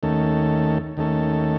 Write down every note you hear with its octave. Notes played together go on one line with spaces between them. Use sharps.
D#2 D#3 A3 C#4 A4
D#2 D#3 A3 C#4 A4